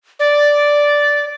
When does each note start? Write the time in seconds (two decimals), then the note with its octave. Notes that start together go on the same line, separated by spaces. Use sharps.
0.20 D5